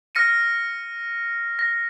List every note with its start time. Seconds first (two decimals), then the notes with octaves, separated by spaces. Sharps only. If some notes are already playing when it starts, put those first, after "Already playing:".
0.15 F6 A#6 C#7 D#7
1.59 A#6